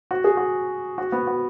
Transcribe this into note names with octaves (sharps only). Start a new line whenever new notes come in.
F#4
G#4
F#4
F#4
B3
F#4